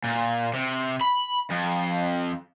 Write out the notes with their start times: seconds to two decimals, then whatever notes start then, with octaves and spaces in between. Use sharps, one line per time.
0.04 A#2
0.54 C3
1.01 B5
1.51 F2